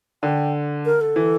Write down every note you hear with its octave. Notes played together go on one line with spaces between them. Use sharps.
D3 G5
A#4
A4
E3